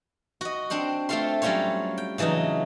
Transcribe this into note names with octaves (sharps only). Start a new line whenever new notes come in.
F#4 D#5
C4 D4 C5 F#5
A3 C4 F4 A4 F5 C6
F#3 G3 C#4 F4 C5 C#5
G5
C#3 E3 F#3 D4 D#4